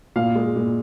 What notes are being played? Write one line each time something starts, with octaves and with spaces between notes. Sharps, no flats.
A#2 F5
G#3
A#2